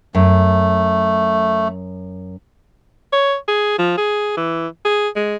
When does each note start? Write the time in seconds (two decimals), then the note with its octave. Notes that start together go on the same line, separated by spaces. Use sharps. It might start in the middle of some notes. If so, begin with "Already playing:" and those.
0.15 F#2 A3
3.13 C#5
3.48 G#4
3.79 F3
3.98 G#4
4.37 E3
4.85 G#4
5.16 G#3